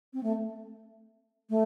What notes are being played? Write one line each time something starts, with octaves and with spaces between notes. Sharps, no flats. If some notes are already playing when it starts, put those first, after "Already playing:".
C4
A3
A3